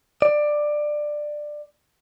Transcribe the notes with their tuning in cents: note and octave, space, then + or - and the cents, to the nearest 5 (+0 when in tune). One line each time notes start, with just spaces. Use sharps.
D5 +15